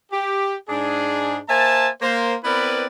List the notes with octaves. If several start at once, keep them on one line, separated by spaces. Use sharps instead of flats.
G4
G#2 D4 G#4
A#3 C5 E5 G#5 A5
A#3 C5
B3 C4 E4 A#4 B4 D5